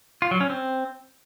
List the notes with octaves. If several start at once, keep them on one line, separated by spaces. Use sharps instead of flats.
F4
F#3
C#4
C4